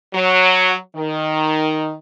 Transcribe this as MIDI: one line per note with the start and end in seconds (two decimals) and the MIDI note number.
0.14 0.76 54
0.96 1.95 51